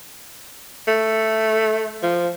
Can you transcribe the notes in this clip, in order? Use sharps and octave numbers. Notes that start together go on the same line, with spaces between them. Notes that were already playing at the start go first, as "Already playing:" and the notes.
A3
F3